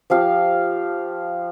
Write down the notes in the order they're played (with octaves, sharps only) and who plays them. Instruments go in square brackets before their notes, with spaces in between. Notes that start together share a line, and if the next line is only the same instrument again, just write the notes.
[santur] F3 G4 F5